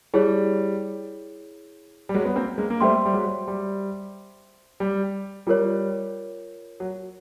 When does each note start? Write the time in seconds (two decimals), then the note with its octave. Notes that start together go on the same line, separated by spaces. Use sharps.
0.14 G3 E4 G#4 C#5
2.09 G3
2.14 F#3 G#3
2.25 B3
2.36 A#3 C4
2.58 G#3 A#3
2.70 A#3
2.80 G3 A3 C5 E5 G5 C6
3.06 G3
3.13 F#3 G#3
3.48 G3
4.80 G3
5.47 G3 F4 A#4 C#5
6.80 F#3